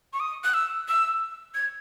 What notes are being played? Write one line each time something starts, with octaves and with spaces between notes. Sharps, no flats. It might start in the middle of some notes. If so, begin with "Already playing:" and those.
C#6
D#6
F#6
E6
E6
G#6